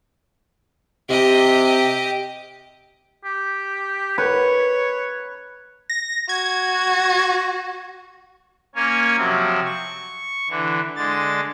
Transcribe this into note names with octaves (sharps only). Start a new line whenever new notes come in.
C3 G4 D#5
G4
B4 C#5
A#6
F#4 G#6
A#3 C#4 C#5 G#5
C3 F3 F#3 C4
C#6
D3 E3
D3 G#3 A6